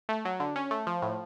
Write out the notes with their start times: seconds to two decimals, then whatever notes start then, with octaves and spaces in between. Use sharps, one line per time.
0.09 A3
0.25 F#3
0.40 D3
0.56 C#4
0.71 A3
0.87 F3
1.02 A2